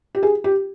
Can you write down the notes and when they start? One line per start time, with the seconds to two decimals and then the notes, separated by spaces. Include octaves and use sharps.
0.15 G4
0.23 G#4
0.44 G4